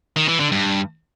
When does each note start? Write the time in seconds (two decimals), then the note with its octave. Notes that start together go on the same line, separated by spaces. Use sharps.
0.16 D#3
0.28 E3
0.40 D3
0.52 G2